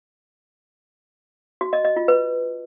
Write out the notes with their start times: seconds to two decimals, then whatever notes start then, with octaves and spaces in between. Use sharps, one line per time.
1.61 F#4
1.73 D#5
1.85 D#5
1.96 F4
2.08 B4